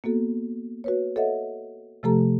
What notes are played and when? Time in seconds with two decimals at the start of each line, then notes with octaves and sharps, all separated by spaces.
0.04 A#3 B3 F#4 A4
0.84 F#4 B4 C#5
1.16 A4 C#5 D#5 E5 F#5
2.03 C3 F3 A3 G4 A4 A#5